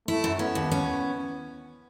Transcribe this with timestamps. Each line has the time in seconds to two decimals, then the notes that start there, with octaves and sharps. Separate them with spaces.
0.08 A3 E4
0.24 F#2
0.39 B3 C#4
0.55 D#2
0.71 C#4